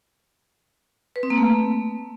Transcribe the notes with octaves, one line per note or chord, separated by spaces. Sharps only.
B4
C4
A#3
A3